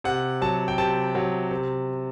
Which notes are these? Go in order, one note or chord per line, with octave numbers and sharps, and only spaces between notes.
C3 F#5
F#3 A5
G5
C3 A5
F#3
C3